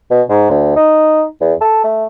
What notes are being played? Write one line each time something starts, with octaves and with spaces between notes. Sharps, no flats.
B2
G#2
D2
D#4
E2
A4
A3